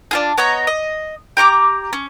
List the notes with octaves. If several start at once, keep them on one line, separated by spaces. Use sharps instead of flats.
D4 F4 G#4
B3 C#5 D#5 A#5
D#5
G4 A#5 C#6 D6
C#4